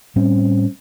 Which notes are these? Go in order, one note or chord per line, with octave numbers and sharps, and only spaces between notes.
A2 G3 C4 C#4